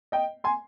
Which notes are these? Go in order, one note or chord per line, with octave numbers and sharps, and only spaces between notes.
D#5 G5
G#5 C6